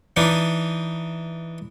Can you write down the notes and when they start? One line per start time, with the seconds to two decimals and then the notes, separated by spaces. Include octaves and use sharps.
0.17 E3 D4 D#4